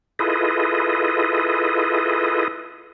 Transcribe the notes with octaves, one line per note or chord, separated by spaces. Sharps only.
E4 F4 G#4 A4 B4 D#5